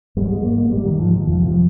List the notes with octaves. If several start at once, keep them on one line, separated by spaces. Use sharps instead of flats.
G#2 G3
G#3
A#3
A#3
G#2 G3
D#3
F3
D#3
F2 C3 F3
F3